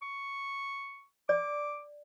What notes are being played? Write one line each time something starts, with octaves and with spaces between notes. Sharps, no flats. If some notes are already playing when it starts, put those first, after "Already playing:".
C#6
D5 D6